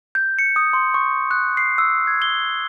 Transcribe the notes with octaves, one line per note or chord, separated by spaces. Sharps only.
G6
C#7
D#6
C6
C#6
F#6
C7
E6
G#6
G7